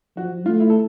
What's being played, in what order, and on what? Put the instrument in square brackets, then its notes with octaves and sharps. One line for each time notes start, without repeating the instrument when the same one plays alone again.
[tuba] F3 [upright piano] F#4
[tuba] A3 [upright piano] F4
[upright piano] E4
A4